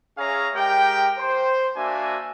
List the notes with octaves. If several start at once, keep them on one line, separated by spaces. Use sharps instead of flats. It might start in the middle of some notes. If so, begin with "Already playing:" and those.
C#4 G#4 C#5 E5 F5 A#5
G#3 G4 A#4 G5
C5
A#3 D4 F#4 E5 G#5